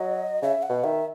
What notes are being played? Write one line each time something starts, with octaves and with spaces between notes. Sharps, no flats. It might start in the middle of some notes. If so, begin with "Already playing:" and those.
Already playing: F#3 D#5
C#3 E5
F#5
B2
D#3 E5